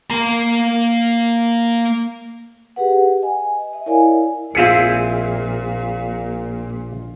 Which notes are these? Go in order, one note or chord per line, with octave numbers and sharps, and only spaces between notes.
A#3 A#5
G4 G#4 B4 F#5
D#5 G#5
D#5 E5
E4 A#4 C#5 D5 F5 G#5
A#1 A#2 C4 E4 F4 G#4 C#7